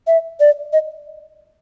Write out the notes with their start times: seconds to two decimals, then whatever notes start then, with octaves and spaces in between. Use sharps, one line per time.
0.07 E5
0.40 D5
0.73 D#5